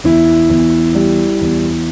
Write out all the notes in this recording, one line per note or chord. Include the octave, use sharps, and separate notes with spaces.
E2 E4
E2
G3
E2